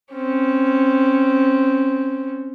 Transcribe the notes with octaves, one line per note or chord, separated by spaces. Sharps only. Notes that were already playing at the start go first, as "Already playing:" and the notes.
C4 C#4